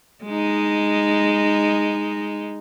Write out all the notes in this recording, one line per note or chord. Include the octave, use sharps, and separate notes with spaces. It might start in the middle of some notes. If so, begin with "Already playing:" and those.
G#3 D#4